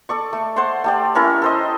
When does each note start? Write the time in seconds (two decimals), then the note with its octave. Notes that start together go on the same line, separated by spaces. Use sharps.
0.09 A4 D5 C#6
0.33 A3
0.56 C5 F#5 A5 C6
0.84 A3 G4 D5
1.15 C#4 E4 A#4 C#5
1.42 A4 C5 D#5